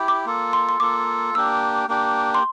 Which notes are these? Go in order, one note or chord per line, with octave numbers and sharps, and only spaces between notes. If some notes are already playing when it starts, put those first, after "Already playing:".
Already playing: E4 G4
D6
A#3 F4 A4
C6
C6
A#3 F4 A4 D6
A#3 D4 G4 E6
A#3 D4 G4
C6